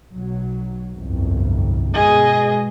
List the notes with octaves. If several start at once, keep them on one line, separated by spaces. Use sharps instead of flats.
B1 F#3
G1 C2 F2
B2 G#3 G#4 D#5